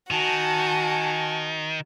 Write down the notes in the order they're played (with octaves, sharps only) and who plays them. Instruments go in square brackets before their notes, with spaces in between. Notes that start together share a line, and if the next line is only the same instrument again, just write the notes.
[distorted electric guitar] D#3 [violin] F#4 [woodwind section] G#5 A5